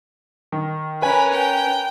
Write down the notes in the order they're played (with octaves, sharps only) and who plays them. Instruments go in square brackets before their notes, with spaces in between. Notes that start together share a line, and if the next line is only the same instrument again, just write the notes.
[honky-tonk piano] D#3
[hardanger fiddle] C#4 A#4 [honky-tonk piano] B4 G#5 [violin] B5
[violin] G5